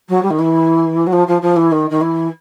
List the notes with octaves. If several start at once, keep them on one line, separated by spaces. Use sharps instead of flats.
F#3
G3
D#3
E3
F#3
F3
F3
F3
E3
D#3
D#3
E3